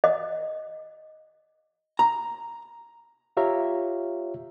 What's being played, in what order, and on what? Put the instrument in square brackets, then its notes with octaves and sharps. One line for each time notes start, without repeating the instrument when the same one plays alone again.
[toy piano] D#5
[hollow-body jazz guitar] A#5
[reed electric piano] F4 G4 C#5 E5 F5 A#5